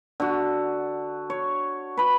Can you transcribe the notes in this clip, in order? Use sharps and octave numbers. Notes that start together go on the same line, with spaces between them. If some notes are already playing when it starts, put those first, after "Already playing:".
D3 F#4
C#5
B4 B5